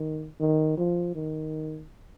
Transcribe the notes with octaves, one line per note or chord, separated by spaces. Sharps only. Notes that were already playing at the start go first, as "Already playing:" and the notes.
Already playing: D#3
D#3
F3
D#3